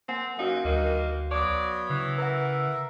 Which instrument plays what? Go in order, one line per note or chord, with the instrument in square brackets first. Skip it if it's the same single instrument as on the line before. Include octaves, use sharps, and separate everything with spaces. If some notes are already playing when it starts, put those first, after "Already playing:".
[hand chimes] A#3 F#5 G#5 [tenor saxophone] C4
[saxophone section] F#2 [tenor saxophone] D#4 [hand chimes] F#4 F5
[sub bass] D2 [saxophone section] G2 D#3 D#4 [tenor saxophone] A#3
[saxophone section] F#3 B3 C#5 [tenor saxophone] D5
[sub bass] C#3 [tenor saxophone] E3
[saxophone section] A#4 E5 [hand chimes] B4 F#5